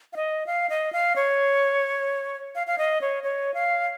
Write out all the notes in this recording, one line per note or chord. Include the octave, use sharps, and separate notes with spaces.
F5
D#5
F5
D#5
F5
C#5
F5
F5
D#5
C#5
C#5
F5